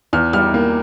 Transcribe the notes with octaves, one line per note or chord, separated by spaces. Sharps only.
E2 F6
G3 F6
A#3